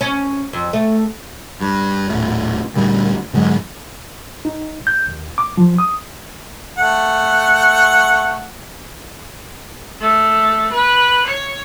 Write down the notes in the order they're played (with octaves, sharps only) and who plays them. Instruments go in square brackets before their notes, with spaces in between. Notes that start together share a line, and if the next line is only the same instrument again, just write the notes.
[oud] C#4
F2
A3
[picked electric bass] G2
D#1 A2
D2 A#2 G3
G#2 D3 F#3 G#3
[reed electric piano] D#4
G6
D#2
D6
F3
D#6
[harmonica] A3 F#5
[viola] A3
B4
C#5